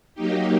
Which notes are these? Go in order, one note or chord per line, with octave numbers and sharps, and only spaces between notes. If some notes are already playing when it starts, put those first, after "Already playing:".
F#3 A#3 D#4 G4